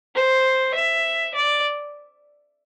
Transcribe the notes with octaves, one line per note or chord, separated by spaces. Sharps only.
C5
E5
D5